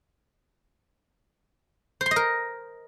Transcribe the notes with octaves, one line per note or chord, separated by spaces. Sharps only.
C5
C6
D#5
A#4